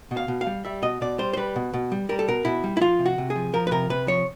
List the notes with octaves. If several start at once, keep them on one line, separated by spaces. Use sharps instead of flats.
B2
F5
B2
F5
G3
G3 E5
B2 D#5
B2 D5
G3 C5
C5
G3 B4
B2
B2
G3
G3 A#4
A4
B2 A#4
B2 E4
G3
E4
F3 F4
C3
F#4
C3
G#4
F3
F3 A#4
B4
C3 A#4
C3 B4
F3 C#5